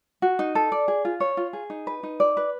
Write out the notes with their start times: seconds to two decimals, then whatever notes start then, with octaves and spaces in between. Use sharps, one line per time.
0.22 F#4
0.39 D#4
0.55 A4
0.72 D5
0.88 G#4
1.05 F4
1.20 C#5
1.37 F4
1.53 G#4
1.70 D#4
1.87 B4
2.03 D#4
2.20 D5
2.37 B4